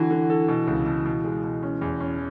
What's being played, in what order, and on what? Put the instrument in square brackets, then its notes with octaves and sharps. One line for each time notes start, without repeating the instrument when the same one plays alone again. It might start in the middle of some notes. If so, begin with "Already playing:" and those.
Already playing: [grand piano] D3 F#4 [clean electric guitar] E3
[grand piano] D3
A4
B2
C#2
B2
B2
G#3
B2
C#4
E2
C#4